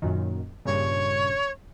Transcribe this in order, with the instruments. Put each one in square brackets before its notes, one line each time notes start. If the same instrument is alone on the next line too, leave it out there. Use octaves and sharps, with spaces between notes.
[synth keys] F#2 A#2 D#3
[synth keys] G2 A#2 C#3 [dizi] C#5